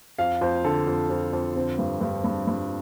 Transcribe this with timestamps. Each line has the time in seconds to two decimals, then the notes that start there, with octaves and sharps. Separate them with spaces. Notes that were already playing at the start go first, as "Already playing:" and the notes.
0.19 F2 F5
0.41 F2 C5
0.64 D3 A4
0.87 F2
1.10 F2
1.33 F2
1.56 D3 C4
1.79 G2
2.01 G2
2.24 G2
2.47 G2